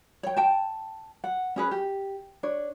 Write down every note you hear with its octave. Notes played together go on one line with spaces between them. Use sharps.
C#5 G5
G5 A5
F#5
C#4 G#4 B4
G4
D4 C#5